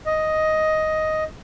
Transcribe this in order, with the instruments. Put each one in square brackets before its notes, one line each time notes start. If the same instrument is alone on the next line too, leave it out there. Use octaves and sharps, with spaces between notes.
[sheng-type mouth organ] D#5